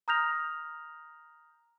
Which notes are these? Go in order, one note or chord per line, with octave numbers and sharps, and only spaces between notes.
A#5 D#6 F6 G6 A#6 F7